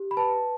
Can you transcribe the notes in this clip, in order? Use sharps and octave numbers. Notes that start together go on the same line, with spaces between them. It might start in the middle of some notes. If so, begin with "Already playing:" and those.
Already playing: G4
B5
B4 A5